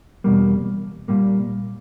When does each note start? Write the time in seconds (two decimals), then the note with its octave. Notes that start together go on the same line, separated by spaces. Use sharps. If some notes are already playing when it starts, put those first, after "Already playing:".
0.24 E2 B2 G3 A#3
1.08 A#2 G3 A#3